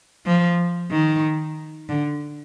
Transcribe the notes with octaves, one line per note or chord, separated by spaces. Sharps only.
F3
D#3
D3